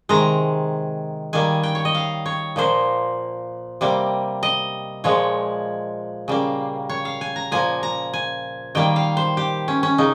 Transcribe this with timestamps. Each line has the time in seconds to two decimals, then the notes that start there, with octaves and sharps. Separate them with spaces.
0.09 C3 D#3 G#3 A#5
1.33 D#3 G3 A#3 G#5
1.63 G5
1.75 C#5
1.85 D#5
1.95 F5
2.26 C#5
2.56 A#2 F3 A#3 C5
3.81 C3 G3 A#3
4.43 D#5
5.04 A#2 F3 G#3 C#5
6.28 C#3 G3 A#3
6.90 C#5
7.05 F5
7.21 G#5
7.36 A#5
7.51 A#2 F3 A#3 G#5
7.83 A#5
8.13 G#5
8.75 D#3 G3 A#3 G5
8.96 F5
9.17 C5
9.37 G4
9.68 C#4
9.83 C#4
9.98 C#3 D#4